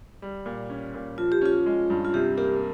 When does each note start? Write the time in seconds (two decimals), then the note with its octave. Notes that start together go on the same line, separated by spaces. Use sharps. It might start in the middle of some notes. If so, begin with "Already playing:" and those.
0.22 G3
0.46 A#2
0.70 C#4
0.94 A#2
1.18 F3 F4
1.32 G4
1.41 C#4 F4
1.66 G#3
1.90 G2
2.05 F4
2.14 C3 G4
2.37 A#3 G4